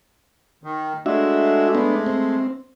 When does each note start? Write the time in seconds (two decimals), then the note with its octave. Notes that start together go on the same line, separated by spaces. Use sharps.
0.64 D#3
1.06 G#3 A3 D4 F#4 E5
1.75 B3 D4
2.06 C4